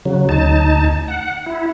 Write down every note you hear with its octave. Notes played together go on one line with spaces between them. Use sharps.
C#3 F#3
D2 D#4 A5
F#5
E4